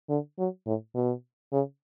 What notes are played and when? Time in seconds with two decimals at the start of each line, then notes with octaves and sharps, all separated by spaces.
0.09 D3
0.39 F#3
0.66 A2
0.95 B2
1.53 C#3